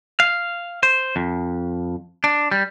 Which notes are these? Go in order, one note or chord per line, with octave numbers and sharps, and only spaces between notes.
F5
C5
F2
D4
G3